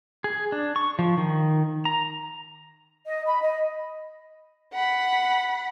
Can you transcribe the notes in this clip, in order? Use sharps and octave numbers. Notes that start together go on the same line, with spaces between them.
G#4
D4
C#6
F3
D#3
A#5
D#5
B5
D#5
F#5 B5